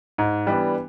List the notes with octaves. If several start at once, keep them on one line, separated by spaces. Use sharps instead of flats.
G#2
E3 G3 B3 D4